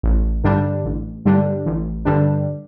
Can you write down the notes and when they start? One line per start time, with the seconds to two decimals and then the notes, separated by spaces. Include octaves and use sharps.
0.03 A1
0.44 G2 D3 G3 D4
0.84 A1
1.25 G2 D3 G3 D4
1.66 A1
2.05 G2 D3 G3 D4